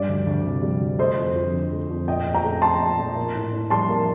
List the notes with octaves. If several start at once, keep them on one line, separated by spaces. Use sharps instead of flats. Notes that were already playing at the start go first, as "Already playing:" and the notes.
Already playing: G2 G3 D5
D2
D2
C3
G3
D2
A3 C5 D#5
F2
F2
D3
A3
F2
A#2 D#5 G5
A#2
G5 A#5
A3
A3 A5 C6
A#2
A#2
A#3
A2
A2
G3 A5 C6
A#3